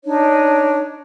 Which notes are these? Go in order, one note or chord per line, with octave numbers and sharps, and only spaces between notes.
D4 D#4 C#5